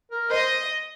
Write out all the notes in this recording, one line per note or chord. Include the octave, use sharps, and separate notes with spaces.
A#4
C5 D#5